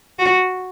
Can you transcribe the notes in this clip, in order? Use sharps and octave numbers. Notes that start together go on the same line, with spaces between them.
F#4